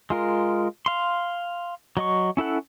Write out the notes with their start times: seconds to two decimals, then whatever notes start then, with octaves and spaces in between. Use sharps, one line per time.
0.10 G#3 F4 A#4
0.86 F5 C6
1.97 F#3 D#5 C#6
2.37 C#4 E4 A4 F#5